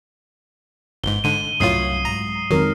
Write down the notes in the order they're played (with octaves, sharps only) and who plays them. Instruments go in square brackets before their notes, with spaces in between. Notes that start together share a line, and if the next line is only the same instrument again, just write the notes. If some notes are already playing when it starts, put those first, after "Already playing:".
[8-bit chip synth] G1 G#2 [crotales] G7
[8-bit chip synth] G#2 D3 [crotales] D#7
[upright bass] C2 [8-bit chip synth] F#2 A2 F4 [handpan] F#3 C#5 [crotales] D#6 C7
[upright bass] G#2 [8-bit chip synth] A#5
[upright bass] F2 G#3 [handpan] D#3 A#4 [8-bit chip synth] F#3